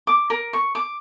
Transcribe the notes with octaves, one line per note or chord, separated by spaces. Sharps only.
D6
A#4
C#6
D6